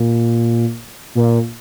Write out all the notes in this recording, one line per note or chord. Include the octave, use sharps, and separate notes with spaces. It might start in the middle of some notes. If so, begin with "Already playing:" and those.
Already playing: A#2
A#2